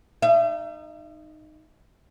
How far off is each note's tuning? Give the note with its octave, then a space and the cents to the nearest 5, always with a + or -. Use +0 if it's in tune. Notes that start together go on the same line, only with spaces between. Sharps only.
D#4 -15 E5 +35